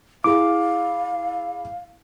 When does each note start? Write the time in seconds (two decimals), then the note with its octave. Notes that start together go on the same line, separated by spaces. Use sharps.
0.24 E4 G#4 F5 D6